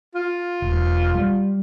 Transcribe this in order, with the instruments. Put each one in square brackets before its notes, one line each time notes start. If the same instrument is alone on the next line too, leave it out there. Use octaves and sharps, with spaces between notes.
[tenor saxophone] F4
[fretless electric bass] E1
G3